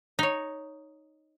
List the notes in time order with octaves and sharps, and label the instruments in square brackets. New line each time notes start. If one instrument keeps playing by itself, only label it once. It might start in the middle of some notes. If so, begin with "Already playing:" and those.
[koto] D#4 C#5